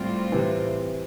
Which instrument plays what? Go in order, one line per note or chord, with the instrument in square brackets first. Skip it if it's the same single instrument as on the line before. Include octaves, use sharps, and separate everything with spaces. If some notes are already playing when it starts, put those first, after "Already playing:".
Already playing: [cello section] A2 G3 C4 F4
[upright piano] C3 E3